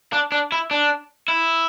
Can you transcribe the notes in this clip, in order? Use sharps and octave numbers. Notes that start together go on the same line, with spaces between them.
D4
D4
E4
D4
E4